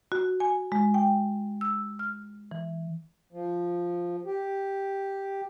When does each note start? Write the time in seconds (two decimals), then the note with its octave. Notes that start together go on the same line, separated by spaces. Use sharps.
0.12 F#4
0.40 G#5
0.72 G#3
0.94 G5
1.61 E6
1.99 F6
2.51 E3
3.33 F3
4.26 G4